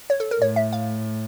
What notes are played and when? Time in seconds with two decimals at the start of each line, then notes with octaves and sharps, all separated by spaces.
0.10 C#5
0.20 A4
0.31 A#4
0.41 A2 C#5
0.56 E5
0.73 F5